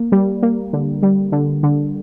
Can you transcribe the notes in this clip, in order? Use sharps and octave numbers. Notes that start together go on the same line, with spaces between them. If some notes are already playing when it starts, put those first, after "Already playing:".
Already playing: A#3
G3
A#3
D3
G3
D3
D3